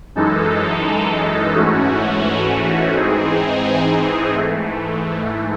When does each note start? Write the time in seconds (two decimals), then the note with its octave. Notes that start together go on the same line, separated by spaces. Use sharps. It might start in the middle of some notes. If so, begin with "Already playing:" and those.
0.15 F#2 E3 G#3 D#4 A4
1.55 G#2 E3 A3 C#4 F#4
2.95 G#2 E3 C4 D#4 G#4
4.33 G#2 E3 A3